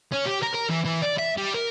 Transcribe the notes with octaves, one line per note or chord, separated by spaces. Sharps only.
C#4
G4
A#4
A#4
E3
E3
D5
E5
G3
A#4